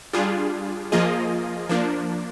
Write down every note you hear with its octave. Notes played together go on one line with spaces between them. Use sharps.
G3 D4 F4 G#4
F3 A#3 F4 G#4 D#5
F3 A#3 D4